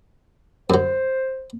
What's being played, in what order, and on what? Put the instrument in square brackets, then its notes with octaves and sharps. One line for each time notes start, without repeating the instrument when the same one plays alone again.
[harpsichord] F#2 F#3 [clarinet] C5